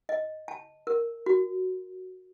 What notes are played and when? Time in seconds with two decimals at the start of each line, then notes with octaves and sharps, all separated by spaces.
0.09 D#5
0.48 A5
0.87 A#4
1.26 F#4